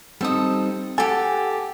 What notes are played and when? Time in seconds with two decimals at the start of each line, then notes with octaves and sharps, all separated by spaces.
0.21 G3 C4 D#4 A4 D#6
0.98 G4 A4 F#5 G#5